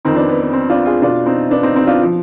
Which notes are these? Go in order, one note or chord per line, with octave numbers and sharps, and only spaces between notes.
F2 D#3 C4 D#4
B3 D4
B3
B3
C4
D4 F4
F4 G#4
B2 D4 F4
C4 D#4
B3 D4
C4 D#4
C4 D#4
D4 F4
F3